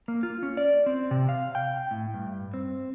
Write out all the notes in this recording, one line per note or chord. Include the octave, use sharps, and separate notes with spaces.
A#3
F4
C#4
D5
C4
C3
F5
G5
A2
G2
C4